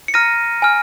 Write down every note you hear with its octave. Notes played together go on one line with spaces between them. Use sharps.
C#7
A#5 F6 A#6 D#7
G#5 F6